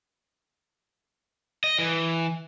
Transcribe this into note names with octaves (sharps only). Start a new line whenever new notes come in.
D#5
E3